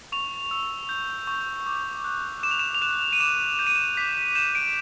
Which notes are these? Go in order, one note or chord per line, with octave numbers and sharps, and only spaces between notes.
C#6 F7
E6
G6
C#6
D6
F#6
D6 E7
F7
E7
F7
F#6 E7
D#7
D6 E7
G6 E7
D#7
E7
D6 B6
G6 E7
D7